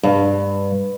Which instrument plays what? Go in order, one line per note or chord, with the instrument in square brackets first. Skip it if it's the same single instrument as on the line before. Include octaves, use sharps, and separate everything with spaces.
[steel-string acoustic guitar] G2